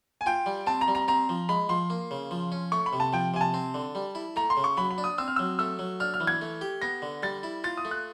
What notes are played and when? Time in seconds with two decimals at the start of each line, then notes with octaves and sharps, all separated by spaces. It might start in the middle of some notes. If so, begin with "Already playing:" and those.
0.21 G#5
0.26 F4 G5
0.46 G3
0.67 C4 A5
0.81 A#5
0.88 G3
0.95 A#5
1.08 C4 A#5
1.29 F3
1.49 G#3 B5
1.69 F3 C6
1.90 A#3
2.11 C#3
2.31 F3
2.52 C#4
2.72 A3 C#6
2.86 B5
2.93 C3
3.00 A5
3.13 F3 G5
3.34 C3 G#5
3.41 A5
3.54 C4
3.74 D3
3.95 G3
4.15 E4
4.36 A3 A#5
4.50 C6
4.57 C#3
4.64 C#6
4.77 F#3 B5
4.91 B5
4.98 D4
5.04 D#6
5.18 C4 E6
5.28 F6
5.36 F#3 E6
5.59 A3 E6
5.79 F#3
6.00 D4 F6
6.14 F6
6.20 E3
6.27 G#6
6.41 A3
6.61 G4
6.82 B3 A#6
7.02 D3
7.23 G3 A6
7.43 E4
7.64 F4 A6
7.77 D#6
7.85 A3
7.91 F#6